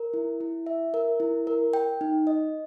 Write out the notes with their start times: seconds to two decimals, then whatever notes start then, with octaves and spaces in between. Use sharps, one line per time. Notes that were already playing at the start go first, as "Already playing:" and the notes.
Already playing: A#4
0.14 E4
0.40 E4
0.66 E5
0.94 A#4
1.20 E4
1.47 A#4
1.73 G5
2.01 D#4
2.27 D#5